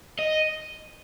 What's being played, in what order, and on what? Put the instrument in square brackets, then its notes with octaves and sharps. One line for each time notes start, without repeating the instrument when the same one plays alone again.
[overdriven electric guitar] D#5